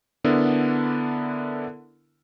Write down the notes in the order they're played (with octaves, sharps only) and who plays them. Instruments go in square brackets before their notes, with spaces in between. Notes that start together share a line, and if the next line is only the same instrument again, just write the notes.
[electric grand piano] D3 B3 D4 E4 A4 A#4